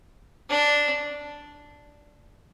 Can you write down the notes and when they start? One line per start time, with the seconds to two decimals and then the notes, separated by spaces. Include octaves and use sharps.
0.49 D4